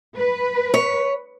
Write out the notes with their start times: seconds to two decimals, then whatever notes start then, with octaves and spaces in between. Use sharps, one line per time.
0.17 B4
0.74 C#5